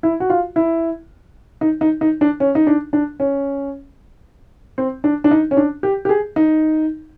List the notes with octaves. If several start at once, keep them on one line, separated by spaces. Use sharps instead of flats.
E4
F#4
F4
E4
D#4
D#4
D#4
D4
C#4
D#4
D4
D4
C#4
C4
D4
D4
D#4
C#4
D4
G4
G4
G#4
D#4